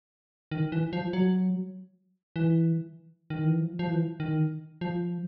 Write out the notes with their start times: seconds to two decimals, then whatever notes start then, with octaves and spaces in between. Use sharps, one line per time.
0.51 D#3
0.72 E3
0.93 F3
1.13 F#3
2.36 E3
3.30 D#3
3.44 E3
3.59 F3
3.79 F3
3.89 E3
4.20 D#3
4.81 F3